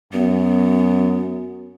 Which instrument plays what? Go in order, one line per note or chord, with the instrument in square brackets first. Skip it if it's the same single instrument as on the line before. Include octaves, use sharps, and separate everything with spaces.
[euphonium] F#2 [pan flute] B3